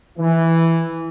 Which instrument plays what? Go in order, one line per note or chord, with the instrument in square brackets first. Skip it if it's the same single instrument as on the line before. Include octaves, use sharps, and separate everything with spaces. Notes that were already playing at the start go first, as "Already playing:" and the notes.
[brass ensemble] E3